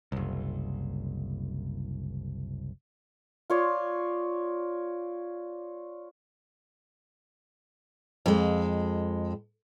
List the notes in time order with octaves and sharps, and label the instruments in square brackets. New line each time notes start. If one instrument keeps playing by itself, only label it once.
[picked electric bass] F#1 C2
[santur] F4 C#5 D5
[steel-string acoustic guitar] F2 G#3